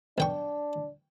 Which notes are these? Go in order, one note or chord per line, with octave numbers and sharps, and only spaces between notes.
B1 D4 G5 C#6